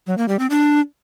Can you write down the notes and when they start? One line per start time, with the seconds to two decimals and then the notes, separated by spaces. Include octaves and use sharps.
0.07 F#3
0.18 A#3
0.28 G3
0.39 C4
0.50 D4